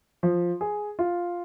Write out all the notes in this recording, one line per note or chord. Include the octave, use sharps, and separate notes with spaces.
F3
G#4
F4